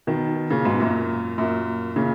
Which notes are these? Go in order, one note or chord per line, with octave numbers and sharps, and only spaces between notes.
B2 D#3
A#2 C#3
G#2 B2
F#2 A#2
F#2 A#2
A#2 C#3